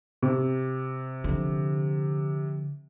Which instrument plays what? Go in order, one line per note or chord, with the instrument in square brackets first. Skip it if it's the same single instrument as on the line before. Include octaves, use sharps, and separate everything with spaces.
[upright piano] C3
[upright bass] D3 F3